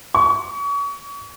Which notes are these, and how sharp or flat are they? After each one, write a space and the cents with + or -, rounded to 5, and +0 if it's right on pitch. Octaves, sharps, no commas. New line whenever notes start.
C#6 +35